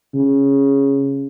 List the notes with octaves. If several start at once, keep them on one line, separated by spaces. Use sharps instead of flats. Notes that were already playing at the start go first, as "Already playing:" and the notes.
C#3